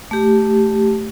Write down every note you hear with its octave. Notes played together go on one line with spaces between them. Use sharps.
A3 G4